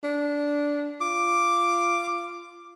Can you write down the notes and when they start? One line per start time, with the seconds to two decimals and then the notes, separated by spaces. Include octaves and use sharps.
0.03 D4
1.01 F4 D6